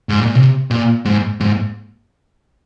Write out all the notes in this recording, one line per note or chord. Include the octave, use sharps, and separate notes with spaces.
G#2
A#2
C3
A#2
G#2
G#2